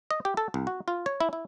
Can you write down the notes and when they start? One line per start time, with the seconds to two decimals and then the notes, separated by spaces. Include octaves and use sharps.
0.11 D#5
0.25 G4
0.37 A4
0.54 C2
0.67 F#4
0.88 F4
1.06 C#5
1.20 E4
1.33 E4